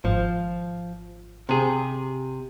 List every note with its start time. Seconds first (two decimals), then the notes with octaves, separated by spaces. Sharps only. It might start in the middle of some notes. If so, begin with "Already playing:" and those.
0.05 G#1 F3
1.49 C3 G#4